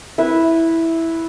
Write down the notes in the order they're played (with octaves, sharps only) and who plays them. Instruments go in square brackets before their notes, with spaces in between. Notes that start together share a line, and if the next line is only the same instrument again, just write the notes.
[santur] E4 B4 E5